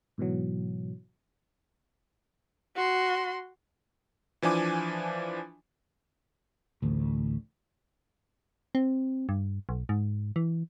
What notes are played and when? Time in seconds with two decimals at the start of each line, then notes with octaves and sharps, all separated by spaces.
0.18 G#2 B2 E3 F#3
2.76 F#4 C6
4.42 E3 F3 D4 G#5 D6
6.82 A1 D2
8.75 C4
9.29 G2
9.69 B1
9.89 G#2
10.36 E3